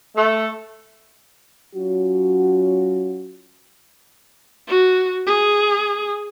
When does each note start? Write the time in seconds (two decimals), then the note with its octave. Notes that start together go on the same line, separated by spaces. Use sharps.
0.15 A3
1.75 F#3 C#4 F4 F#4
4.68 F#4
5.27 G#4